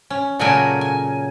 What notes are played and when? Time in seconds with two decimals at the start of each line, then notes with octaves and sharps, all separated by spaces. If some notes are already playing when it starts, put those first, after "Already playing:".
0.10 C#4
0.39 A#2 C#3 F#3 A3 A#4 G#5
0.81 G#5